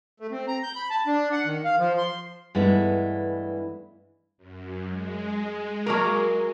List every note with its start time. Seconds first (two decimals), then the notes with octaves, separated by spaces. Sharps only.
0.20 A3
0.31 C4
0.48 A#5
0.63 G6
0.76 B5
0.90 A5
1.07 D4
1.32 F#5
1.45 D#3
1.65 F5
1.78 F3
1.98 C6
2.55 G2 E3 G#3 A3 B3 E4
4.37 F#2
4.89 G#3
5.86 F#3 A#3 A#4